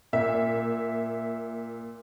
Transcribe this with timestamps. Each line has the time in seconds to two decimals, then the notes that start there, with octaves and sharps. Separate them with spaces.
0.13 A#2 E5